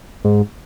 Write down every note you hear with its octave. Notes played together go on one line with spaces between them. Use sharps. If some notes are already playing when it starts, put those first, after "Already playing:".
G#2